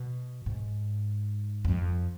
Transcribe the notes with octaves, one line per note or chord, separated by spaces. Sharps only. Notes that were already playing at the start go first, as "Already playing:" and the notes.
Already playing: B2
G#2
F2